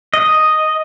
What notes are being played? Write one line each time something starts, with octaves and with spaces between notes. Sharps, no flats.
D#5